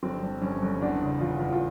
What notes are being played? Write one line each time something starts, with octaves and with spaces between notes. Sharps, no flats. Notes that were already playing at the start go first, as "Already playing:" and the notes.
G1 C4
G2
G1 C#4
G1
E2 D4
C#3
E2 F4
E2
F4